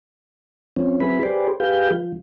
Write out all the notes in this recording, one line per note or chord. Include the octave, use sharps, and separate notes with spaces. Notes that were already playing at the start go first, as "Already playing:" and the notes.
F3 C4 C#4
F#3 C4 E4 G#4 B4 B5
G4 G#4 B4 C5 D5
G4 G#4 B4 F5 G6
F3